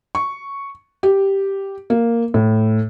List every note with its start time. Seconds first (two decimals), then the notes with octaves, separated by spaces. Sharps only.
0.15 C#6
1.03 G4
1.90 A#3
2.34 A2